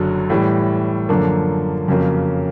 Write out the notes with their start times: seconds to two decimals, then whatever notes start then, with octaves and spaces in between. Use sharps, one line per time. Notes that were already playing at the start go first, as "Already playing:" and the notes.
Already playing: F#1 F#2 D3 F#3
0.30 A2 E3 G3
1.09 F#2 D3 F3 A#3
1.88 F2 C#3 F#3 A#3